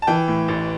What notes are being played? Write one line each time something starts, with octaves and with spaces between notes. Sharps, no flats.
A5
E3 G5
A2
A1